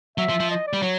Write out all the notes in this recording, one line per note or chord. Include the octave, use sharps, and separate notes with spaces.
F#3 E5
F3
F3
D#5
D5
G3
F#3 C#5